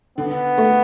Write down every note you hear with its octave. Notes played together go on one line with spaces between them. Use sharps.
D3 B3
A3